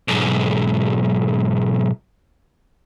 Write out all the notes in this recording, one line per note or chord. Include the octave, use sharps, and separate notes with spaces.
B1 G#2